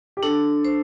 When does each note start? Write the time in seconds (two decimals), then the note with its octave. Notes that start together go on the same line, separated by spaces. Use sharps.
0.17 G4
0.23 D4 A4
0.65 C5